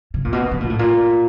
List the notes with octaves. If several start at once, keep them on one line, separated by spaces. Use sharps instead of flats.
C3
A#2
B2
B2
A#2
A2
A#2